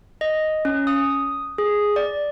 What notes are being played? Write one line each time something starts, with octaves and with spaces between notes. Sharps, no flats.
D#5
C#4
D#6
G#4
D5